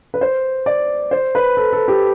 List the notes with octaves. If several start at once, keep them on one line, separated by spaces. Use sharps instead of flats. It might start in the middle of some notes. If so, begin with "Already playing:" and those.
B4
C5
D5
C5
B4
A4
A4
G4